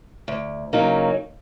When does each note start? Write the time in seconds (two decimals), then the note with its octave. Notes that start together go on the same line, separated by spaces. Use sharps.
0.28 D2
0.73 C#3 F#3 A#3 D#4